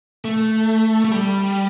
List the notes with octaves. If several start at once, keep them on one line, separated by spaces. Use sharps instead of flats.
A3
A3
G3